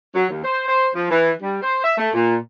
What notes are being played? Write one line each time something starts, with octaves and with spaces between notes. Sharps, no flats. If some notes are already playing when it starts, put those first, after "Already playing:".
F#3
D#2
C5
C5
F3
E3
G3
C5
E5
A3
A#2